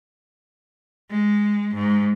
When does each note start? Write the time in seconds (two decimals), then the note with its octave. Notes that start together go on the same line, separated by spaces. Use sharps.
1.10 G#3
1.75 G#2